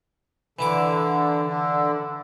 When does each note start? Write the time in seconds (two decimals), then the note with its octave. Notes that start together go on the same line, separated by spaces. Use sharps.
0.59 D3 E3 E4 D6
1.45 D3